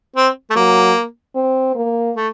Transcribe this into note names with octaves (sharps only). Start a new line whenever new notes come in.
C4
A3
F#3 A#3
C4
A#3
A3